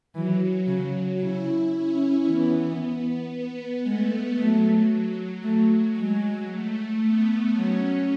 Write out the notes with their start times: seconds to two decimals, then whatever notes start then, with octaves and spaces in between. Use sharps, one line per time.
0.14 E3 F#3
0.68 C#3 F#3
1.20 C#3 E4
1.73 C#4
2.27 E3 B3
3.32 B3
3.86 G#3 A3
4.39 F#3 A3
5.44 A3
5.98 G#3
6.50 A3
7.03 B3
7.56 F#3 C#4